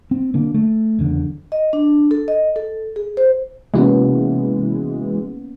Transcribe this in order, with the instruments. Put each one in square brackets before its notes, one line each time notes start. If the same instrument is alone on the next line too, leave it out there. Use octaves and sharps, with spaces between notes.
[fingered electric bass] C4
D3 A#3
A3
F#1 E2 D3
[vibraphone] D#5
D4
A4
D#5
A4
G#4
C5
[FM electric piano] C3 F#4 [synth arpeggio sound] E3 G#3 [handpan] A#3 B3 C#4